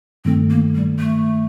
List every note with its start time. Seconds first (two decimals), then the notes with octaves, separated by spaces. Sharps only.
0.25 G2 D#3 A3 C4
0.50 A#3
0.75 G3
1.00 A3